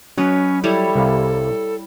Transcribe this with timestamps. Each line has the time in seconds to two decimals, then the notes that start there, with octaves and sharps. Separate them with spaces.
0.18 F#3 C#4 B4 C#5 D#5
0.64 G3 E4 A4 C#5
0.95 C2 C3 F5